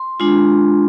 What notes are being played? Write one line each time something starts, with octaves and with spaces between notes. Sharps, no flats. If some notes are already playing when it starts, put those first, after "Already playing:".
Already playing: C6
G#3 D4 F4